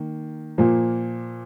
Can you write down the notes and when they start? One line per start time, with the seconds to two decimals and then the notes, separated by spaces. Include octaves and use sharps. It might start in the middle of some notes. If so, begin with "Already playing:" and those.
Already playing: D#3 A#3
0.58 A#2 F3 A#3